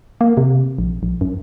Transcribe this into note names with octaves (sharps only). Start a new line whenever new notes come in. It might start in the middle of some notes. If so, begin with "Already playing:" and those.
A#3
C3
A#1
A#1
F#2